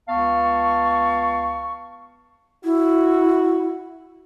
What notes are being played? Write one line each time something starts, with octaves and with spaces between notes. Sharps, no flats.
C#2 B3 F5 A5 C#6
E4 F#4